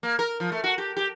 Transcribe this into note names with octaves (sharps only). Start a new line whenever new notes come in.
A#3
A#4
F3
A3
F#4
G4
G4